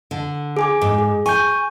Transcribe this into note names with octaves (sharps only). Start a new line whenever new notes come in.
D3
G#4 G#5 D6
G#2
G#4
G#5 C#6 G6